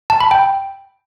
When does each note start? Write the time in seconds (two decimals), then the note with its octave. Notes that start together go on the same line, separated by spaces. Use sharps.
0.10 A5
0.20 B5
0.31 G5